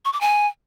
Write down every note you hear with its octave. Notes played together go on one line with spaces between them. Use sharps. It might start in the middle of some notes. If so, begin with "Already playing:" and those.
C#6
D6
G#5